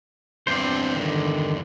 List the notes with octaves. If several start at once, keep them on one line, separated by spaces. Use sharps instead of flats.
E2 G2 C4 D4 C5
D3 D#3